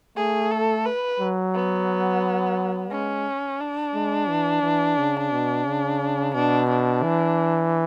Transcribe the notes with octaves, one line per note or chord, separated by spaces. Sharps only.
A3 G#4
A4
B4
F#3
B3
G#3 C#4
D4
G#3
E3
E3
C#3
B2
C#3
B2 D4
D4
E3